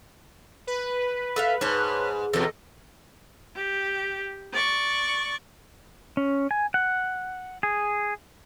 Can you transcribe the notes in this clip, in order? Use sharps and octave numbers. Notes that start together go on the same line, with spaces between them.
B4
A4 E5 F5
G#2 C#5 A5
E2 B2 A4 D#5
G4
D5 C#6
C#4
G#5
F#5
G#4